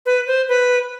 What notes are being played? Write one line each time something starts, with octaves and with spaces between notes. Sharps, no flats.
B4
C5
B4